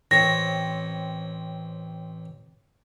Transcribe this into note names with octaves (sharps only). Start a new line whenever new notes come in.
A1 C4 C#5 A#6